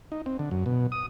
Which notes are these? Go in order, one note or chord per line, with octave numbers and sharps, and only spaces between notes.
D#4
C4
D3
F#2
B2
D#6